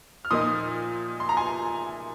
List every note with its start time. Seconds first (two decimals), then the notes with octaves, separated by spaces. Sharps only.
0.25 F6
0.30 A#2 F3 A#3 D#4 C6 D#6
1.20 C6
1.29 A#5
1.37 G#5 C6